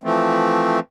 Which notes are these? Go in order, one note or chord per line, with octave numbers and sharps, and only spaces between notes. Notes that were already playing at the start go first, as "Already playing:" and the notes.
E3 F3 A3 C4